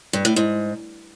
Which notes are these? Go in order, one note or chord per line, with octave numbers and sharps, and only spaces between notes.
G2
A2
G#2